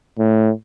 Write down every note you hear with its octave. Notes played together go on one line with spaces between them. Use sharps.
A2